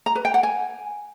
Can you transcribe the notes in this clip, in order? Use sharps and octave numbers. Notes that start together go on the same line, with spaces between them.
A#5
B4
G5
F#5
G#5